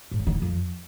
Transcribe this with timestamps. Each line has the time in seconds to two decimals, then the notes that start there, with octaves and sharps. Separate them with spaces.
0.11 G#2
0.19 C#3
0.27 D#3
0.34 E3
0.42 F2